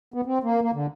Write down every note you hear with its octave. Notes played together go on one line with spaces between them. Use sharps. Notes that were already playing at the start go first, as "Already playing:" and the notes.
B3
C4
A#3
A#3
D3